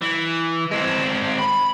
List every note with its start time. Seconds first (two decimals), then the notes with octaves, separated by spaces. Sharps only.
0.02 E3
0.71 G#3 C4
1.39 B5